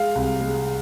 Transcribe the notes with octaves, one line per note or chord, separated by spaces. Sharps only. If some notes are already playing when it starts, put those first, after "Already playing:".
Already playing: G#3 F5
C2
G#3